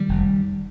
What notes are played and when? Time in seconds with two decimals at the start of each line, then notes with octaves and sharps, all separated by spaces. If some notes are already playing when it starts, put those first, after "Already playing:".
Already playing: D#3 G3
0.09 F1